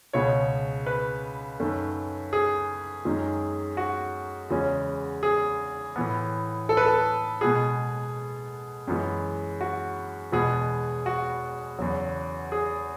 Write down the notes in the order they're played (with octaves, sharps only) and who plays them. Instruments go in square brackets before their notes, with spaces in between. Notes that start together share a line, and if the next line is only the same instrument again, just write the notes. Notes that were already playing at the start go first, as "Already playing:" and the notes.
[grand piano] C#2 B2 G#3 C#5
B4
F#2 D#3 A3 C#4
G#4
F#2 D#3 G#3
F#4
E2 C#3 G#3 C#4
G#4
A2 E3 B3
A4
B4
A4
B2 G#3 B3 G#4
F#2 E3 G#3 B3
F#4
E2 B2 G#3 B3 G#4
F#4
E2 C#3 F#3
G#4